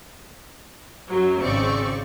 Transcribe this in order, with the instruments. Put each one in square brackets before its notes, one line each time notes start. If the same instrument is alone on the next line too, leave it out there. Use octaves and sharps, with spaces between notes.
[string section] F#2 F#3
G#1 C#3 C4 D5 C#6